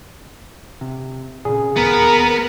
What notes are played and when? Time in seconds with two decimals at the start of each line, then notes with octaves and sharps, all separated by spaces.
0.81 C3
1.45 A#2 C#3 G#4
1.76 D1 D#2 B3 A#4